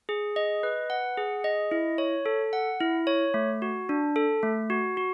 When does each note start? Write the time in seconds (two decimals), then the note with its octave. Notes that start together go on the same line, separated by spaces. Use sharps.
0.09 G#4
0.36 D#5
0.63 B4
0.90 F#5
1.18 G#4
1.44 D#5
1.71 E4
1.98 C#5
2.26 A4
2.53 F#5
2.80 E4
3.07 C#5
3.34 A3
3.62 F#4
3.89 D4
4.16 A4
4.43 A3
4.70 F#4
4.97 F#4